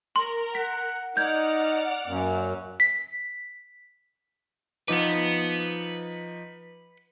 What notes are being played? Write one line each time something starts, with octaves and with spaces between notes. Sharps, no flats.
A#4 C6
F#5 B6
D#4 D5 F#5 F6 G6 G#6
F#2 A#3
B6
F3 D#4 B4 F#5 D6